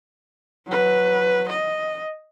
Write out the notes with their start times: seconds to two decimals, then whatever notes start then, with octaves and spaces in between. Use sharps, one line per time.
0.67 F#3 B4
1.49 D#5